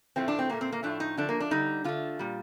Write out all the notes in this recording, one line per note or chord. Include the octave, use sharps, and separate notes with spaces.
A2 F3 A3 C4
D4
C4
A#2 A3 A#3
C4
A#3
A2 F3 A3 D4
D#4
D3 F3 A3 D4
A#3
D4
D3 G3 D#4
D3 A3 F4
A#2 G3